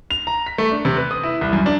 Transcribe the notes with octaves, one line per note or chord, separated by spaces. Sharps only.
F7
A#5
B6
A3
D4
C3
B4
D#6
E4
C2
F#2
D4